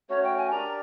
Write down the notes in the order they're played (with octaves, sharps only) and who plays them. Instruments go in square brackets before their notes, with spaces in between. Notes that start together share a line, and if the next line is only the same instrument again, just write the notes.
[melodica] A3 C#4 F#4 [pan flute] C#5
[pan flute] G5
G#5
[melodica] D4 G4 A#4 D5 [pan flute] A#5